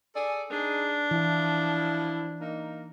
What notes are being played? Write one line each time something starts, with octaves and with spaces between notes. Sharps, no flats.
G#4 A4 D5
D4 D#4 G#4
E3 F3 E4
A#3 D#4